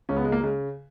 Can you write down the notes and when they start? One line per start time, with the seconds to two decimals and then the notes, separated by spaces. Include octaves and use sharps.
0.09 C#2 C#3 C#4
0.16 B3
0.24 G#3
0.32 A#3
0.41 G#3
0.44 C#3